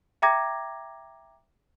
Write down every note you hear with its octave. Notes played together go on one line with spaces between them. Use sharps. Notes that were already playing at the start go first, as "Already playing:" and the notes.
E5 G5 A#5 D6 G#6 A#6